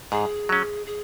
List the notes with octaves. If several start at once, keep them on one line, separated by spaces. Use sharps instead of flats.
G#2 G#4
F#3 C#4
G#4